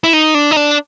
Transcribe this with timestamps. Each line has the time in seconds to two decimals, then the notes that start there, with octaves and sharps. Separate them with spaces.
0.04 E4
0.13 D#4
0.34 D4
0.51 D#4
0.57 D4